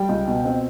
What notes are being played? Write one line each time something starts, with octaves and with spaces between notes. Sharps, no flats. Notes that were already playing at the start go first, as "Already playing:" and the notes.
Already playing: G3 G5
C#2
B2
C4